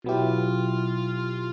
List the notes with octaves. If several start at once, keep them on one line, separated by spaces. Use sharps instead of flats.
B2 F#3 B3 E4 F4 G4